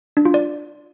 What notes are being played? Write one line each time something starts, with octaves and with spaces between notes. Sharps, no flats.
D4
F4
D5